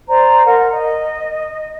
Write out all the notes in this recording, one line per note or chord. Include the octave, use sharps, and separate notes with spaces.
C5 D5 A#5
A#4 F#5
D#5